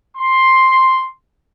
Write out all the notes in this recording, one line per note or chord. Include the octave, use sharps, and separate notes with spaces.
C6